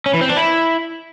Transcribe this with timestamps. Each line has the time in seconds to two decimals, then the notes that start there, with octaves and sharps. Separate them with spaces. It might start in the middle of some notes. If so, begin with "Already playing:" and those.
0.06 C#4
0.14 E3
0.21 C4
0.29 D4
0.37 E4